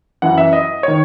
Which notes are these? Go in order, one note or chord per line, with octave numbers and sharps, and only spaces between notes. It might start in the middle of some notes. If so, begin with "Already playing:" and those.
F#2 E3 F#5
E5
D#5
D#3 C#5